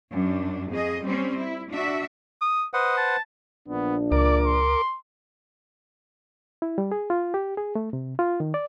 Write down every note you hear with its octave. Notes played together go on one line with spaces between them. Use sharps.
F#2 D4
F2 G#4 D#5
G3 C4 C#4
E4
D4 F#4 E5
D#6
B4 C5 D#5 F#5
A5
A#1 F3 B3 D4
C#2 A#4 D5 D6
C6
E4
G3
G#4
F4
G4
G#4
A3
C3
F4
D#3
D5